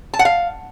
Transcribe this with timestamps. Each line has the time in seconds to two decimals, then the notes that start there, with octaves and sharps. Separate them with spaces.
0.14 A5
0.19 F#5
0.25 F5